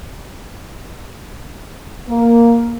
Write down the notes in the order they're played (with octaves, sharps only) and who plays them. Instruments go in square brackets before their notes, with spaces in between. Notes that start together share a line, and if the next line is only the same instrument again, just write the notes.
[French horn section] A#3